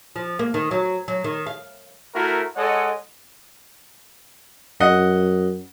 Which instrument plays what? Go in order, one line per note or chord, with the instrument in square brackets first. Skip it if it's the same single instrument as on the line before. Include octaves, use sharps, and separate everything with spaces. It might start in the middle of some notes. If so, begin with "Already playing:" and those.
[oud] F3
A#3
D#3
F#3
F#3
D#3
F5
[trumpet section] A3 E4 F#4 A#4
G#3 A4 C#5 D#5 F#5
[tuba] F#2 [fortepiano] D#5 F#5